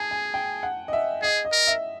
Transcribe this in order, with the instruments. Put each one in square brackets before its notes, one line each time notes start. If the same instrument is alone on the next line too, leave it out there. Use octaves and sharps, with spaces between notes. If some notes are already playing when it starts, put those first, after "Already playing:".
Already playing: [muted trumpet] G#4 [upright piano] G#5 A5
[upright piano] G#5
G5
F#5
D#5
E5
[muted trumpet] G#4 [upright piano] D#5
[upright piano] D#5
[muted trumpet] A#4
[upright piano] E5